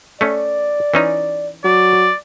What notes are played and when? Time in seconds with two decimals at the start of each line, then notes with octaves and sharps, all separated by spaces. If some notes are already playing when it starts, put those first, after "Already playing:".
0.21 A3 C#4 D5
0.94 E3 C#4 D#4
1.64 F#3 D5